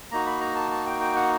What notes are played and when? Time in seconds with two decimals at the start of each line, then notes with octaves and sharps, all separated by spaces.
0.11 A#3 D#4 F#4 A#5
0.26 B5
0.41 A#5
0.55 A5
0.71 A5
0.87 G5
1.01 G5
1.16 F#5